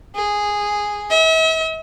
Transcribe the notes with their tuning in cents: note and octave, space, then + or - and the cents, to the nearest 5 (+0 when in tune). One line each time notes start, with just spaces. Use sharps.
G#4 -5
E5 -40